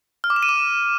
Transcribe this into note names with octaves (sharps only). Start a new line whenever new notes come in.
F6
D6
E7
D#7
D6